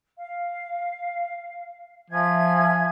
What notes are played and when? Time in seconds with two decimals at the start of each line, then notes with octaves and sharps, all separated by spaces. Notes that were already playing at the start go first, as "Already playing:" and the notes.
0.18 F5
2.11 F3 E5 G#5 G#6